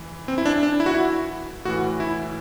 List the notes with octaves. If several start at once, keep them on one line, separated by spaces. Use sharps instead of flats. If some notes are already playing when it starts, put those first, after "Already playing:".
Already playing: E3
C4
E4
D4
D4
E4
F#4
E4
A2 E3 F#4
E4